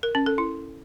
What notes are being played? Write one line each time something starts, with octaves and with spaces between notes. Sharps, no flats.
A#4
C#4
A4
E4